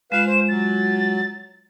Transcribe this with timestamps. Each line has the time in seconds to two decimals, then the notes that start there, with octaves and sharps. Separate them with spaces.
0.12 G#3 F4 B4 F5 E7
0.26 C5
0.49 F#3 A6